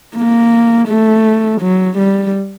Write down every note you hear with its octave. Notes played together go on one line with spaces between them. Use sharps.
A#3
A3
F#3
G3